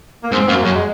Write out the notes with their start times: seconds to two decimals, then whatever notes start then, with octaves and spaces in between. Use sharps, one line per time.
0.23 A#3
0.32 G#2 C4
0.42 C4
0.48 F#2 A#3
0.65 F#2 F#3
0.76 G#3